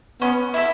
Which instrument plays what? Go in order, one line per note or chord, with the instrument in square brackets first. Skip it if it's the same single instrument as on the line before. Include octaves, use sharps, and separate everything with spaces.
[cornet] B3 [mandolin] C#4
[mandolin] E4 A4 E5